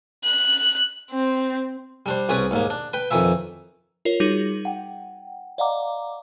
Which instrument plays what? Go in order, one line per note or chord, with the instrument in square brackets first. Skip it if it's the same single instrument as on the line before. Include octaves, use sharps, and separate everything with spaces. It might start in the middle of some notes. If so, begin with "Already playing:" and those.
[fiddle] F#6
C4
[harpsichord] G3 D4 C5
C2 C#4 G#4 B4 D5
D#2 G#2 A#3
D4
B4 G5
F2 D#3 E3 E5
[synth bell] F4 A#4 C#5
G3 D#4 F#4 G#4
F#5 G5
D5 D#5 F5 F#5 A#5 D6